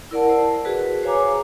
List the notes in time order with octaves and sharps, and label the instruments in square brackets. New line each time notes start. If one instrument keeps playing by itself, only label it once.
[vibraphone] E4 A#4 D5 F#5 A5
C5
F#4 G#4 B4
C5 C#5 F5 G#5 A#5 D6